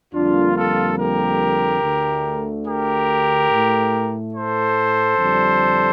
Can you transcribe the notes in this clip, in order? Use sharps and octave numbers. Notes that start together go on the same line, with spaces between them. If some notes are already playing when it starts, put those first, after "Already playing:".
F2 D3 G3 A#3 D4 F4
F4 A4
G4 A#4
D2 D3 A3
G4 A#4
A2 A3
A4 C5
F2 D3 G3